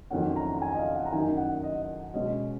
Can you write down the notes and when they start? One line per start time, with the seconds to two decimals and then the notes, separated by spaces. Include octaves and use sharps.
0.10 F2 D#3 F#3 C#4 F#5
0.36 A#5
0.55 A#5
0.62 G#5
0.74 D#5
0.79 F5
0.96 F#5
1.05 A#5
1.12 F#2 D#3 A#3 D#4 G#5
1.37 F#5
1.63 D#5
2.14 B2 G#3 C#4 D#5